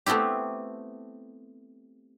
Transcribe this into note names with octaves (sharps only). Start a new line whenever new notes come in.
A3 B3 C4 E4 G4